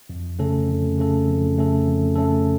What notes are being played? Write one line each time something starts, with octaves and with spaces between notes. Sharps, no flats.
F2
C#3 A3 C#4 A4
F2
C#3 A3 C#4 A4
F2
C#3 A3 C#4 A4
F2
C#3 A3 C#4 A4